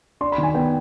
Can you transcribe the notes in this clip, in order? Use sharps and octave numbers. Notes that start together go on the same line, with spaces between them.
D4 C6
B5
D#3
G#5
B3 G5